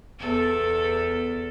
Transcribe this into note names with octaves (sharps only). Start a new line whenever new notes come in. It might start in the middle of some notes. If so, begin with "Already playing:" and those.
E2 A4